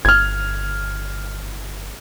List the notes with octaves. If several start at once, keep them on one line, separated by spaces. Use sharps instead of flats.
G1 F6 G#6